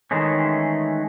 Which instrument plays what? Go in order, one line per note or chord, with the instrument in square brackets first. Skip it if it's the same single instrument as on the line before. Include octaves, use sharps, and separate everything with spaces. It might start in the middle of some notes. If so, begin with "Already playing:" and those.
[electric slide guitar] D#3 E3 G#3 A3 C#4